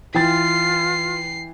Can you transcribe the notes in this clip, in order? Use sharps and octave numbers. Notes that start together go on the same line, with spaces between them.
E3 F4 G5 A6 C7